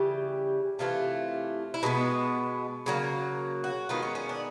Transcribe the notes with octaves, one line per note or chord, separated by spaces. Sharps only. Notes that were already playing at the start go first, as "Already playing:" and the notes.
Already playing: C#3 E3 G3 G4
C3 E3 A3 F4
E4
B2 G#3 B3 D#4
C#3 F#3 A#3
F#4
D#3 G#3 B3 F4
C#4
C#4
D4